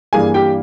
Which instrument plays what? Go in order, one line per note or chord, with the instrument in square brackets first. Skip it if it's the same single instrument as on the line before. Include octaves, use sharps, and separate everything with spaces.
[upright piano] G2 E3 G3 A#3 G#4 G#5
G4 G5